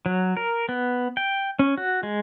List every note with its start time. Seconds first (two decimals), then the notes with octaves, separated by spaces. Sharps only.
0.06 F#3
0.37 A#4
0.69 B3
1.17 G5
1.59 C#4
1.78 F#4
2.03 G#3